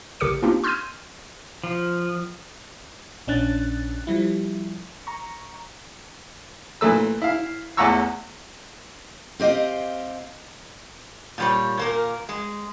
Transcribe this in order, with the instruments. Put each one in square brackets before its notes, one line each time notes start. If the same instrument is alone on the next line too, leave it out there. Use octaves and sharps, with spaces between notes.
[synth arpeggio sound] A1 C#3 G4 A#4 D6 C#7
A#3 C4 D4 D#4 F4 G4
C6 E6 F6 G6 G#6 D#7
[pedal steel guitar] F3
[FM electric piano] A#1 C#4 D4 F#6 A6
F3 G3 E4
A#5 C#6
[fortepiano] A#2 E3 A3 E6
E4 F5
A1 E2 F#5 A#5 C#6 E6
[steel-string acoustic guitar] C4 G4 D#5 F5 G5
[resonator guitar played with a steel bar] A#2 G3 C#5
A#2 A#3 A#4
G#3